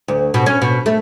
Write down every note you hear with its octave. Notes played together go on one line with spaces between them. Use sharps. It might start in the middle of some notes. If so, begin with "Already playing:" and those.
D2
B2
C#4
B2
A3